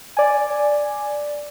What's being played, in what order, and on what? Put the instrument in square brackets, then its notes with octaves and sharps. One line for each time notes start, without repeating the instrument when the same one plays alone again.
[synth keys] D5 G#5